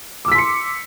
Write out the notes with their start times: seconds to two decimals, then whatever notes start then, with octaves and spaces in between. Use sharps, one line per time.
0.25 D6
0.28 E6
0.32 B6
0.35 C6
0.38 C#7